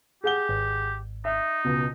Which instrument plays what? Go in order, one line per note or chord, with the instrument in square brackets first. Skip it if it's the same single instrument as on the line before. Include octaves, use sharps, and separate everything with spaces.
[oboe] G4 [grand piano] G#4 F#5 G7
[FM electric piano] G#1
[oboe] D#4 [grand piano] E5
[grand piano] C#2 B2